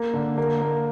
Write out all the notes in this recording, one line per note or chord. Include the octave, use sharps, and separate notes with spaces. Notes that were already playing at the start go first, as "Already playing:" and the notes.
Already playing: A#3
D3
A#3
A#3